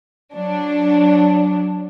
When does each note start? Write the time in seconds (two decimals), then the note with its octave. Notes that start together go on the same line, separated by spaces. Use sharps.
0.34 F#3 D4